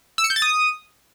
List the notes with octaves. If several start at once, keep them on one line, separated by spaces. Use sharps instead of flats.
E6
C#7
G6
A6
D#6